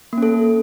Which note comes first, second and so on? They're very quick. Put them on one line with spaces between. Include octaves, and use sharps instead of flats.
A#3 C#4 A4